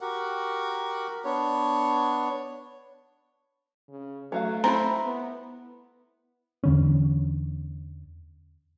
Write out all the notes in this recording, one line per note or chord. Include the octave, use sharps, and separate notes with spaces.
F#4 G4 A#4 F#5
B3 D4 C#5
C#3
F#3 A3 F#4 F5
C4 E4 A#5 B5
B3
E2 D3 C#4